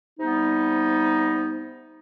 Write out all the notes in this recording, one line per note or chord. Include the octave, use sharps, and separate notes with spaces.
C3 G3 B3 D#4